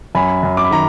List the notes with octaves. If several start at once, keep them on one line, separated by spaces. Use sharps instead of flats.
F#2 G#5 B5
F#2
D6
B5
D#3 A#5